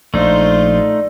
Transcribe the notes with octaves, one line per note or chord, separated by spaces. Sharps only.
A#1 A3 D#4 F4 C5 D5